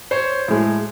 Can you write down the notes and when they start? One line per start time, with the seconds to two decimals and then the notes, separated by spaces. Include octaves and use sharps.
0.11 C5 C#5
0.48 A2 G#3